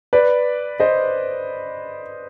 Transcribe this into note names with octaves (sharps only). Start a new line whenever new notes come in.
B4 D5
C5 D#5